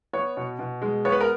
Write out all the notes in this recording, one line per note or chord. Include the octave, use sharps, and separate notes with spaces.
B3 C#5
B2
B2
G#3
B3 C#5
B4
A#4